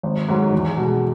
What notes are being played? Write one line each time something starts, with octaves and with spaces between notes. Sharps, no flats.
G#1
G#2 F#3
E2
B2 G#3